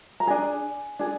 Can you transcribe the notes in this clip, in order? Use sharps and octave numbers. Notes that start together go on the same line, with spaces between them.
A#5
D4 G#4 G#5
D4 G#4